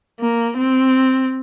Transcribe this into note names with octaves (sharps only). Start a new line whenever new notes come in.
A#3
C4